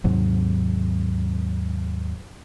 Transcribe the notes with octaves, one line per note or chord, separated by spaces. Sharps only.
D#2 G#2 C3 F#3